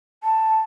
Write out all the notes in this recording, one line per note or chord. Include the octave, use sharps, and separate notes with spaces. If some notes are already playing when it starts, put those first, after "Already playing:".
A5